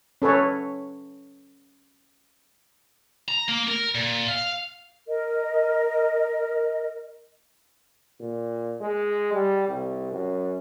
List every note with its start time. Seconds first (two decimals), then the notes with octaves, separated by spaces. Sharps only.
0.22 C#4 A4 B4 C#5
3.28 A#5
3.48 A#3
3.67 A#4
3.95 A#2
4.28 F5
5.08 A#4 D#5
8.20 A#2
8.81 G#3
9.33 G3
9.69 C2
10.12 F#2